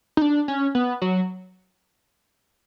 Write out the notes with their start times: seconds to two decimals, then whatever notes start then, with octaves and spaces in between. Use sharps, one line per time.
0.17 D#4
0.22 D4
0.48 C#4
0.75 B3
1.02 F#3